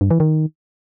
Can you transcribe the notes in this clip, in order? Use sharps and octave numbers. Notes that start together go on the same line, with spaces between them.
G2
E3
D#3